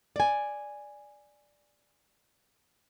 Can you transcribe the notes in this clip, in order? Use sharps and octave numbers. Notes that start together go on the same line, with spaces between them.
D5 G#5